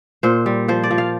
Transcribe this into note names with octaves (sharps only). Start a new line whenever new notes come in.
A#2 C5
G3
F3 C5
D5
F3
F5